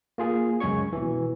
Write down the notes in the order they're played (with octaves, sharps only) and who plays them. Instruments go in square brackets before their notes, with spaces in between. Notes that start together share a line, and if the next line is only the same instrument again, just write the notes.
[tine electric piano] A#3 F4 G#4
C#2 F#2 G#3 C#4 C#5 C#6
B2 E3